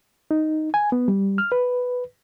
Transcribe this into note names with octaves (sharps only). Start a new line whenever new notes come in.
D#4
G#5
B3
G3
F6
B4